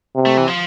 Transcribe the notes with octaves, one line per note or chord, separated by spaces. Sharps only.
C3
A3
E3
F3